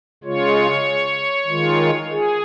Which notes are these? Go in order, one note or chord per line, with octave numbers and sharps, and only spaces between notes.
C#3 G#3 F4 C#5
D#3 G#3 F4
G#4